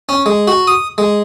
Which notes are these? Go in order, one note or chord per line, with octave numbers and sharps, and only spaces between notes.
C#4
G#3
F#4
D#6
G#3